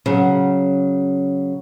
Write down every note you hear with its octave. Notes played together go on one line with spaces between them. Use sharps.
C#3 F#3